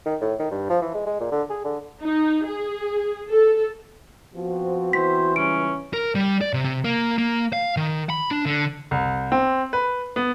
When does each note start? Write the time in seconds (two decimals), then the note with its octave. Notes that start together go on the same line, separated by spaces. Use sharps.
0.06 D#3
0.21 A2
0.40 D#3
0.51 G2
0.70 F3
0.82 E3
0.94 G#3
1.07 G#3
1.21 A#2
1.32 D3
1.50 G#4
1.65 D3
2.01 D#4
2.46 G#4
3.30 A4
4.35 F3 B3 C4 F#4
4.93 E3 C5 B6
5.36 C#2 G3 C#4 D7
5.93 A#4
6.15 G3
6.41 D5
6.53 C3
6.65 C3
6.84 A#3
7.18 A#3
7.53 F5
7.77 D#3
8.10 B5
8.31 D4
8.46 D3
8.91 C2
9.32 C4
9.73 B4
10.16 B3